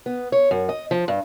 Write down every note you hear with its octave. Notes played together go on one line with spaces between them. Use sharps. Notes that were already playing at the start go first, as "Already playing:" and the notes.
B3
C#5
F#2
D#5
F3
G2